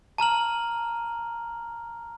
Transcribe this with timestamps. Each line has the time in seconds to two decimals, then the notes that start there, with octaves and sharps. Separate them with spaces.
0.18 A5 A#5 F6 F#7